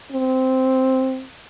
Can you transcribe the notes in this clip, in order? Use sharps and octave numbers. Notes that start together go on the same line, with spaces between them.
C4